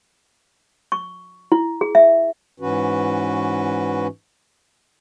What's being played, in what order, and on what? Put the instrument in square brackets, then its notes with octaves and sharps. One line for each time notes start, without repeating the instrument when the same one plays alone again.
[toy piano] C#6
E4
G#4
E5
[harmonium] G#2 E3 C#4 F#4 B4